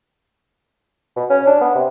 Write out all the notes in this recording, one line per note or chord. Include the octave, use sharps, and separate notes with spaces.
B2
C#4
D4
B3
C3